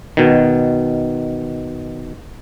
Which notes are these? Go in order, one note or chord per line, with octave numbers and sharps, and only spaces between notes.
B2 D#3